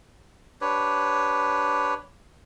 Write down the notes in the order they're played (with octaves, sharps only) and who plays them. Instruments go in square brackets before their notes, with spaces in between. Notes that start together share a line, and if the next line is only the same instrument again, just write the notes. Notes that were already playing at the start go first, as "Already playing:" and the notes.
[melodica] D4 G4 B4 C#5